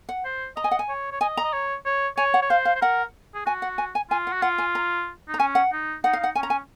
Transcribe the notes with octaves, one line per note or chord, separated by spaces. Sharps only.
F#5
C5
D#5 A#5
G#5
F#5
G#5
C#5
C#5
D#5 G#5
A#5
D#5
C#5
C#5
C#5 G#5
F#5
C#5
C5 F5
F5
C5
A#4 F#5
G#4
F#4 G#5
F#5
G#5
G#5
F4 G#5
F#5
F#4
F4 F#5
G#5
A#5
D#4
A#5
C#4 G#5
F#5
D#4
D#4 F#5
F5
D#4 F#5
C#4 G#5
A#5
G#5